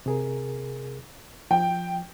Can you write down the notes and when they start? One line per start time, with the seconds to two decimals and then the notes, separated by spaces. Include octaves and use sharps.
0.06 C3 G#4 A#4
1.51 F3 G5